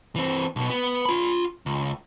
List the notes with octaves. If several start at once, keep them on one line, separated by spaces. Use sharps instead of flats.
E3 C4
B1 B2
B3
F4 B5
C#2